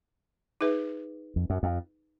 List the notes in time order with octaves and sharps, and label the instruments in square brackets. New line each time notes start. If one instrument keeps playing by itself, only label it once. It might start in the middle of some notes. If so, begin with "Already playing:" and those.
[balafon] D#4 G#4 B4 E5
[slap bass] F2
F#2
F2